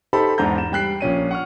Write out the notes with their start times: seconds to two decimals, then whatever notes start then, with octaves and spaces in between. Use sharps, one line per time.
0.13 D#4 G4 A4 C5 A5 B5
0.38 E2 G#2 D4 C5 A#5 G6
0.58 E7
0.72 G3 G5 F#6 C7
1.01 A#1 A#2 C#4 D#7
1.31 F#5 C#6 F6